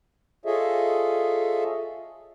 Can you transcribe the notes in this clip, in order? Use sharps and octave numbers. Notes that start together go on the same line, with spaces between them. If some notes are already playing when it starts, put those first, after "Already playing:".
F4 G#4 A4 C#5 D#5 E5